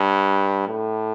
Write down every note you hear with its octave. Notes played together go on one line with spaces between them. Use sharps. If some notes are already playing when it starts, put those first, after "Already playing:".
Already playing: G2
A2